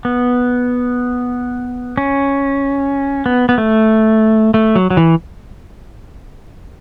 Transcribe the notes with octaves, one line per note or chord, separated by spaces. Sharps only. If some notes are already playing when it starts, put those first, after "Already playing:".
B3
C#4
B3
B3
A3
A3
F#3
F#3
E3